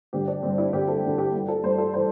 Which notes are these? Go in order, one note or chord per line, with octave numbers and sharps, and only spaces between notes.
G2 D3 G4
D4
G2 D3 C4
E4
G2 D3 G4
A4
G2 D3
G4
G2 E3
A4
G2 E3 C5
A4
E3 C5